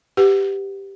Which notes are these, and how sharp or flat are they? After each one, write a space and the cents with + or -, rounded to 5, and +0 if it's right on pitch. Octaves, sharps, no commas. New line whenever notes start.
G4 +0 B4 +20 F#5 +0